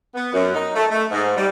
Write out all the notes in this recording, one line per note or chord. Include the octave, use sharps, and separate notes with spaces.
B3
F#2
D#4
A3
A3
G#2
G3